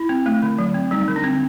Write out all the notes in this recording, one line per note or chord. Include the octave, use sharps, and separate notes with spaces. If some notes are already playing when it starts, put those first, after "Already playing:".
Already playing: E4
C4
A3
D3
F#3
C4
G3 D#4
D3
D4
C4